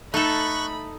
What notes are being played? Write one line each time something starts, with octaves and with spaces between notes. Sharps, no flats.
A3 D#4 A4 B5 C#6 F#6